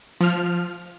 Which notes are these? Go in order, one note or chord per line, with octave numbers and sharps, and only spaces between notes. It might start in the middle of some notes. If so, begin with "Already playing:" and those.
F3 F6